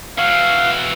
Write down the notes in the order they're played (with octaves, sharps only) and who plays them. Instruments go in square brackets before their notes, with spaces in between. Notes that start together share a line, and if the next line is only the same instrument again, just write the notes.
[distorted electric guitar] E3 F#4 [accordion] F5